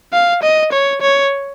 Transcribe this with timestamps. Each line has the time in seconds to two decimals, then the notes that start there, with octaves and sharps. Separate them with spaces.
0.13 F5
0.43 D#5
0.72 C#5
1.01 C#5